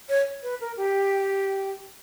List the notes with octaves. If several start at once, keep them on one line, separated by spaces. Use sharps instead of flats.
C#5
B4
A#4
G4